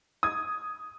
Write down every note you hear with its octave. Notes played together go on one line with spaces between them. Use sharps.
D#6 G#6